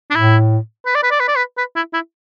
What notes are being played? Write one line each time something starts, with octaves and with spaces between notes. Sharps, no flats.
D4
A2 E4
B4
D5
B4
D5
B4
D5
B4
B4
E4
E4